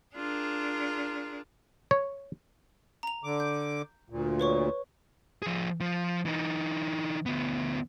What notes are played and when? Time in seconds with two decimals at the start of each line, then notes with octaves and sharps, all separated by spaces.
0.15 D4 F4 G#4 A#4
1.91 C#5
3.03 A#5 F7
3.24 D3 D6
3.40 G6
4.10 D2 A#2
4.40 B4 C#5 C#6
5.42 F3 G#4
5.81 F3
6.26 E3 D#4
7.26 D2 B3